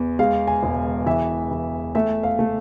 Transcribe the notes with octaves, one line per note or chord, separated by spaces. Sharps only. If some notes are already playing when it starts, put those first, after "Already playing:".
Already playing: E2
G#3 F5
G#5
E1
E3 E5
E3
A3 E5
F5
A3